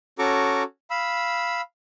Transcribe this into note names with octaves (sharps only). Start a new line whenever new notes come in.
C#4 F#4 A4 A#5 C#6 D6
F5 B5 E6